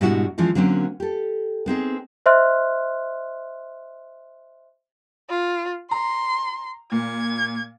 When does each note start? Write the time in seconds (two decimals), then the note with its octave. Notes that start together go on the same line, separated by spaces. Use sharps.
0.01 G#2 B2 G3 D4 E4 F#4
0.38 E3 F3 G#3 C#4
0.55 D3 F#3 A#3 C4 C#4
1.00 G4 A4
1.66 B3 C4 D#4 G#4
2.26 C5 D#5 E5 C6 F6 F#6
5.30 F4
5.91 A#5 C6
6.92 A#2 G#6